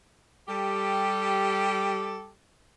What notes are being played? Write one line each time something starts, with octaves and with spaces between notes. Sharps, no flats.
G3 G4 A4